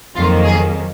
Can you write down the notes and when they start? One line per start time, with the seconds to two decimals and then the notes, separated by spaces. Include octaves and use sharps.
0.15 F2 D#3 F#3 A#3 F4
0.45 G#4